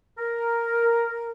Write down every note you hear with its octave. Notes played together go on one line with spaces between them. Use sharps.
A#4